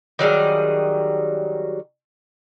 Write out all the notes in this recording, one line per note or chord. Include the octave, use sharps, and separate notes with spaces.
D#3 F#3 G3 G#4